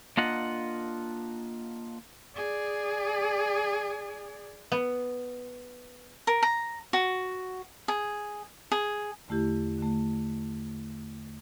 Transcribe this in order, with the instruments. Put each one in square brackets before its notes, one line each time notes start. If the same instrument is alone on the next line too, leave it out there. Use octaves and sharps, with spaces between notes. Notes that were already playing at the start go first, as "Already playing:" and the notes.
[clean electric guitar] A#3 D4 F4 D#5 F#5
[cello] G#4 D5
[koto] B3
[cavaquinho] A#4
A#5
F#4
G#4
G#4
[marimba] E2 D3 A3 E4 G4
D3 A3